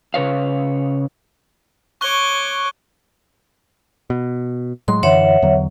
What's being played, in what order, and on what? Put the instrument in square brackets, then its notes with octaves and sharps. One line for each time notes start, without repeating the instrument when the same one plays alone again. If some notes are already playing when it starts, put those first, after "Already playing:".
[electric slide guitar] C#3 B4 C#5 F5
[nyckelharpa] C#5 D6 [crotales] C#6 F#6 G7
[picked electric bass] B2
[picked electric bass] A2 F#3 G#3 [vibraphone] C6
[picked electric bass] F#2 D3 E3 [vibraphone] C#5 E5 F#5
[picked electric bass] E2 D3 F#3